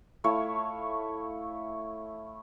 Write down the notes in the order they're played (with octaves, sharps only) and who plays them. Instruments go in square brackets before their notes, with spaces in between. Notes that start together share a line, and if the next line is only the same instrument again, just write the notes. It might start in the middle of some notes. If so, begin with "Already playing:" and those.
[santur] A3 E4 C#5 F5